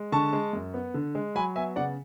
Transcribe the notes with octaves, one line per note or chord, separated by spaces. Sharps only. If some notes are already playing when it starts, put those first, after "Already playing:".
Already playing: G#3
D3 A5 C#6
G#3
F#2
B3
D3
G#3
F#3 G#5 B5
B3 E5 G#5
C#3 D5 F#5